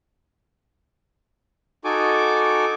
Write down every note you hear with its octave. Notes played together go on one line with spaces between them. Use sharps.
D#4 F#4 A4 G#5 D6